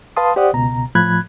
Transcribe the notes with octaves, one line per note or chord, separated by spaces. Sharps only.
B4 F5 A5 C6 D#6
G4 C5 D5 F#5 D#6
C#2 B2 A#5
A2 F3 B5 F#6 G#6